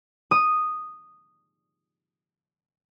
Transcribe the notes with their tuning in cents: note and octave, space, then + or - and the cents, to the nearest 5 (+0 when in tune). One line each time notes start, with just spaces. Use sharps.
D#6 -5